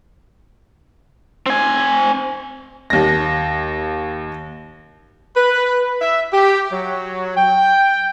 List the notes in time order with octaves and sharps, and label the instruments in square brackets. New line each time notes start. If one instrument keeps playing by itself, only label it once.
[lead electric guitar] C4 G#5
[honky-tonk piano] D#2 A#6
[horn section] B4
E5
G4
F#3
G5